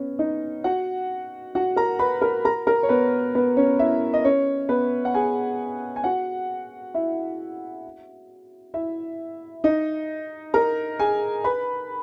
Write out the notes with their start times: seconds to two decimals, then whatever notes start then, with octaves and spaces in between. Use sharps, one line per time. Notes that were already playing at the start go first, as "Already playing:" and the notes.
Already playing: B3 C#4 C#5
0.19 D#4 D#5
0.64 F#4 F#5
1.55 F#4 F#5
1.76 A#4 A#5
1.99 B4 B5
2.22 A#4 A#5
2.45 A#4 A#5
2.67 A#4 A#5
2.83 C#5
2.89 B3 B4
3.35 B3 B4
3.57 C#4 C#5
3.79 E4 E5
4.14 D#5
4.24 C#4 C#5
4.69 B3 B4
5.05 F#5
5.14 G#4 G#5
5.96 G#5
6.04 F#4 F#5
6.94 E4 E5
8.74 E4 E5
9.64 D#4 D#5
10.54 A#4 A#5
10.99 G#4 G#5
11.44 B4 B5